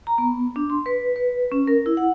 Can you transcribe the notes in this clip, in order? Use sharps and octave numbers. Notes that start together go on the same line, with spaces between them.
A#5
B3
D4
C6
B4
B4
C#4
A#4
E4
F#5